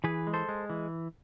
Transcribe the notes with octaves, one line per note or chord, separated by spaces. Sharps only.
E3 G#4 B4
G#3
A4 C5
G#3
E3